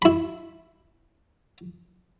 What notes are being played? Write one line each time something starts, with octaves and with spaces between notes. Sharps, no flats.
E4 B5